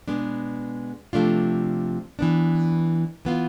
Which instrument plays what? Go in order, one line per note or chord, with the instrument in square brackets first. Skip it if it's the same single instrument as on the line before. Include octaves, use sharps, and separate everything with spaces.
[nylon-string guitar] B2 G#3 B3 D4
C3 F3 A3 D4 F4
E3 B3 D4
E3 B3 F4